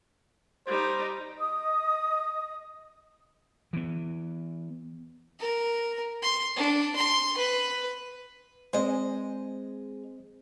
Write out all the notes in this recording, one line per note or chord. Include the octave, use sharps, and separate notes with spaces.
G3 D#4 C5
D#5 D#6
E3 B3
A#4
C6
D4
C6
B4
G#3 C4 C5 D#5